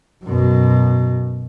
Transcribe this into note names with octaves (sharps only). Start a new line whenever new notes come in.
F#2 B2